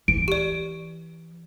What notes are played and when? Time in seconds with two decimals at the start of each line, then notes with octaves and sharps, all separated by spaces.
0.08 E3 D7
0.28 G4 D5